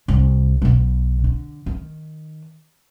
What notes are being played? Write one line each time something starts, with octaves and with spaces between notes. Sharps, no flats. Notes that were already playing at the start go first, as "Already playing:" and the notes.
C2
B1 B2
D3
D#3